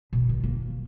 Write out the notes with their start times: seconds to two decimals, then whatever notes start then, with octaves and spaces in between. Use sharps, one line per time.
0.13 B2
0.29 D#3
0.44 A#3